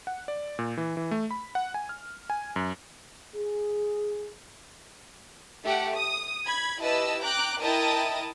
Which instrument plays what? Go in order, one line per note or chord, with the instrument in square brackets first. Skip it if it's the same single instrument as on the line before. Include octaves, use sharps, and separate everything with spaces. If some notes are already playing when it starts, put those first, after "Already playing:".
[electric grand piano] F#5
D5
A#2
E3
E3
A3
B5
F#5
G#5
F6
G#5
F#2
[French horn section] G#4
[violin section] A3 G4 F#5
D#6
B5 G#6
E4 G4 B4 D#5 A5 E6
G5 A#5 D6 F#6 D7
E4 A#4 D#5 G5 A5 D#6